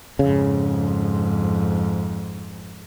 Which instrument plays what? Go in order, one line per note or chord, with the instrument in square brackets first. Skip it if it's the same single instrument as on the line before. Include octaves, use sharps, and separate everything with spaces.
[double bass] F2 G#2 [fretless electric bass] C#3